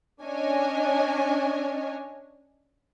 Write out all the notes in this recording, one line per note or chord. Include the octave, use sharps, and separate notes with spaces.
C#4 D4 C#5 D#5 G#5